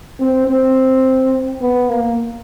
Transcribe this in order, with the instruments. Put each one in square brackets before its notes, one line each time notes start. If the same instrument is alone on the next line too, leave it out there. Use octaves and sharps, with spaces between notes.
[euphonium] C4
C4
B3
A#3